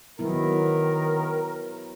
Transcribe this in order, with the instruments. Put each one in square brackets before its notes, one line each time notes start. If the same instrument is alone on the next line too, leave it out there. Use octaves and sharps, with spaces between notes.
[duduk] D#3 [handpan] F#3 B3 E4 [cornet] A#4